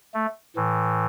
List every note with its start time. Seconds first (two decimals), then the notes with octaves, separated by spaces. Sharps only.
0.14 A3
0.56 A2 E3